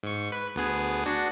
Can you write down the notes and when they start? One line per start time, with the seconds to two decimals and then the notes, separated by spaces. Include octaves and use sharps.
0.03 G#2 C#6
0.32 B4
0.56 D2 B3 G#4
1.06 D4 F#4